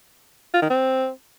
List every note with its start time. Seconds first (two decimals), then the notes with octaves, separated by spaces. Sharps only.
0.54 F4
0.62 D#3
0.70 C4